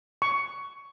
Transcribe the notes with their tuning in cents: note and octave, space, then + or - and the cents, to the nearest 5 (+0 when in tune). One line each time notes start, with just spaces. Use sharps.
C#6 +15